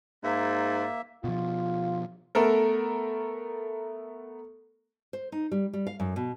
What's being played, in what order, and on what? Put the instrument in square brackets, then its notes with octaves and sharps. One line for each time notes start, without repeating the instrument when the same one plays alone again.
[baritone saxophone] G#2 [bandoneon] A#3 E5
[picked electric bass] B2 F3 [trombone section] F4
[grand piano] A3 B3 A4 A#4
[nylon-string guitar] C5
D#4
G3
G3
F5
F#2
B2